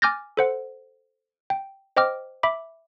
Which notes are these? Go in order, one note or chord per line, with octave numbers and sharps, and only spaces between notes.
G#5 D6 F6 G6 A6 A#6
A4 C5 F#5
G5
C5 D#5 G5 D6 F6
E5 B5 D6